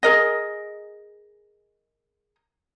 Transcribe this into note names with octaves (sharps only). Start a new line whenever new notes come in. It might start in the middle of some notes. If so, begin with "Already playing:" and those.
G#4 A#4 D#5